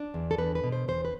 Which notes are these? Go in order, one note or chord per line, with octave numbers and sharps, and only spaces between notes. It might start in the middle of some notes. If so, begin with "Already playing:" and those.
Already playing: D4
E2
A4
E2 B4
B4
B2
C5
E2 C5
B4